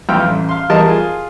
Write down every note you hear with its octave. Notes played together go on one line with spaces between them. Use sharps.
F2 E3 G5 E6 F6
A1
F5 C6
E2 G3 A#4 D#5 A5
F4 G#4